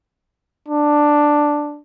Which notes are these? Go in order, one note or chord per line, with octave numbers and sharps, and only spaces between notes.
D4